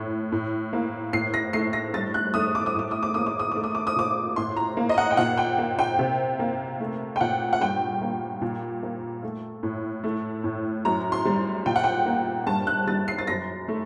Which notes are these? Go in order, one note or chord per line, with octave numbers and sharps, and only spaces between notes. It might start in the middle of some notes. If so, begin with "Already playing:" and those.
Already playing: A2 A3
A2
A#3
A2 C7
A#6
A3 C7
A#6
G2 A6
F#6
A3 D#6
D6
D#6
A2 D6
D#6
D6
A#3 D#6
D6
D#6
A3 D6
D#6
D6
D#6
A#2 D6
A2 C6
A#5
A#3
D#5
F#5
G5
A#2 F#5
G5
A#3
G5
C3
A#3
A3
G5
A#2 F#5
F#5
G2 G5
A#3
A#2
A#3
A3
A2
A3
A2
F#2 A#5
C6
G3
A#2 G5
F#5
G5
A#3
G2 A5
F#6
G3 A6
C7
A6
F#2 A#6
A3